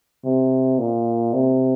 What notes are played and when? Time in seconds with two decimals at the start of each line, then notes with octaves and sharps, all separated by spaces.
0.25 C3
0.79 A#2
1.33 C3